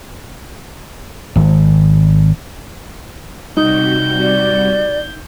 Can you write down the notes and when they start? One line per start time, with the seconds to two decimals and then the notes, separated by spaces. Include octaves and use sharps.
1.36 G#1
3.57 C3 G3 D#4 F#4 G6
4.20 D5